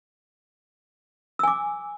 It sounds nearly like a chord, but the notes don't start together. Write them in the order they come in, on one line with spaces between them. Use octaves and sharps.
E6 G#5 D6